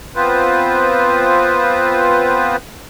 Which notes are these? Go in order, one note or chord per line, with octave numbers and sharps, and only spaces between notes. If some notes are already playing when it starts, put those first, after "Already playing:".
B3 C4 F4 B4 C5